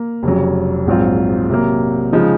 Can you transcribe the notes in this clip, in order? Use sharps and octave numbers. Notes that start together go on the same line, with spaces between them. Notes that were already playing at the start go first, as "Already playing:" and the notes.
Already playing: A#3
F1 F2 C#3 F#3
A#1 G#2 F#3 C4 F4
C3 F#3 A#3
C#3 F3 G#3 D#4